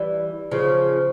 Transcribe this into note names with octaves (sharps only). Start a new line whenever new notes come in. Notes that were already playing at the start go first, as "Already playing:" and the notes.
Already playing: E3 G3
C#3 F3